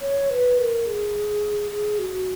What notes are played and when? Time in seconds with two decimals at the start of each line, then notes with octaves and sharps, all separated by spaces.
0.01 C#5
0.30 B4
0.58 A#4
0.86 G#4
1.71 G#4
1.99 F#4